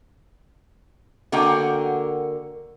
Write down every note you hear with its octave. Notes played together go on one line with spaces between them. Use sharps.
D3 A#3 F#4 A#4 D#5 G5